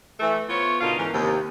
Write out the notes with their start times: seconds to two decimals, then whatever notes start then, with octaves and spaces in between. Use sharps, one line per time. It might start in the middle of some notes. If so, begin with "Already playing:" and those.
0.20 E3 A3
0.49 B3 F4 C5 C#5
0.80 B2 D3 D#4 F4 A#4 F5
0.97 G#2 E3 C#4 A#4
1.13 D#2 C3